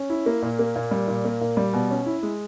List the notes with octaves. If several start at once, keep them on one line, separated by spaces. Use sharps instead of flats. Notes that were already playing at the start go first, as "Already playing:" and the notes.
Already playing: C#4
E4
A#3
A#2
A#3
A#2
G3
A#2
A#3
A#2
G3
B2
C#4
E4
G#3